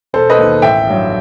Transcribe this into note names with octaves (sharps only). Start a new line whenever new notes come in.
E1 A4 C5
B4 D#5
D#2 D#3
A1 E5 G5
G2 F#3